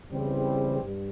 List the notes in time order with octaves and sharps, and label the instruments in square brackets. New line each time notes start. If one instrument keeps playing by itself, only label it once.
[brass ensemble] E2 C#3 E3 G3 C4
G2